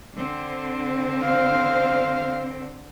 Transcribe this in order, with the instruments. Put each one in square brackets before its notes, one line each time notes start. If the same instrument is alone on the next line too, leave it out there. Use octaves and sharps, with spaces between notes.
[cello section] D3 C4
[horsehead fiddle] C5 F5